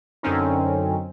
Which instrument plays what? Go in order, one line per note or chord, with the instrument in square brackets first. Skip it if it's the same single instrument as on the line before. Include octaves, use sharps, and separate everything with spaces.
[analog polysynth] F#2 D3 C4 C#4 D#4